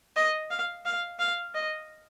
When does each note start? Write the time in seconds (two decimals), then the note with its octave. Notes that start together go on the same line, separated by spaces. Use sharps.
0.16 D#5
0.51 F5
0.85 F5
1.19 F5
1.54 D#5